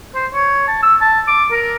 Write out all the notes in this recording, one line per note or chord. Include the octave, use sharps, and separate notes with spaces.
C5
C#5
A5
E6
A5
D6
A#4